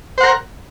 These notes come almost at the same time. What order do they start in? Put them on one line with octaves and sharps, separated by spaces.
C5 F#5 A#4